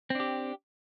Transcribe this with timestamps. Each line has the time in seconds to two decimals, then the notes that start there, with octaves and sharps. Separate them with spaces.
0.10 C4
0.15 D4
0.20 G4